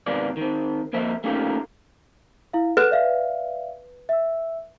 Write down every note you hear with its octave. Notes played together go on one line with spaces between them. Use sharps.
D#2 G#2 C3 A#3 B3 D5
D#3 C4
F2 A#3 C5 D#5 E5
A3 A#3 C#4 D#4 F4 G4
E4 F5
A4 B4 F#5 F#6
D5 E5 F5
E5 E6